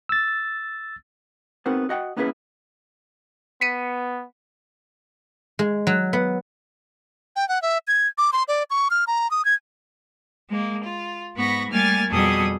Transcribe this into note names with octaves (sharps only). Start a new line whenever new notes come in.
E6 A6
B3 C4 D#4 F#4 A#4 C5
F#4 D#5 F#5 G5
A#3 B3 C#4 E4 G#4 B4
B3 B6 C#7 D#7
G#3
F#3
B3
G5
F#5
E5
G#6
D6
C6
D5
C#6
F6
A#5
D#6
G#6
G#3 A#3
F4
G#2 B3 B5 C#6 A#6
G3 A3 A#3 G#5 F6 A6
F2 B2 G3 G#4 A4 D#6